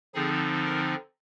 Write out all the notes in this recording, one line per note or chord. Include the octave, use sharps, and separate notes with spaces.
D3 F3 C4 D#4 G#4
A#4